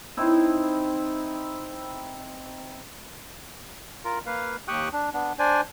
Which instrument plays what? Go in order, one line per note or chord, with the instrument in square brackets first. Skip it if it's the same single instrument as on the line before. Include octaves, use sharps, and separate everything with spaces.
[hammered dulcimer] C4 D#4 E4
[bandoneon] F4 A#4
A#3 B4 F5
D#2 G4 G5 C#6 D#6 F#6
D4
B3 D4
D4 C5 D5 G#5